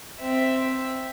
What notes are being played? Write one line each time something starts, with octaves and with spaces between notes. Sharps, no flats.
C4 E5